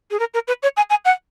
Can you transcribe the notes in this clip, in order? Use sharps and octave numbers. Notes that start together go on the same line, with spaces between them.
G#4
A#4
A#4
B4
C#5
G#5
G#5
F#5